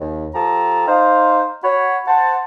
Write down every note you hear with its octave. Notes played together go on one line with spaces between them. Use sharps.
D#2
F3 G4 A4 A5 A#5
D#4 C5 F5
F#4 C#5 B5
C5 F#5 A5